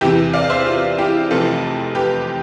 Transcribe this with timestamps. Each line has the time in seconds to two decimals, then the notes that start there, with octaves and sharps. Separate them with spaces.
0.01 E2 C3 E3 E4 G4
0.33 D5 F5
0.50 C5 E5
0.66 F4
0.98 E4 G4
1.31 F1 F2 C3 E3 F4 A4
1.95 G4 B4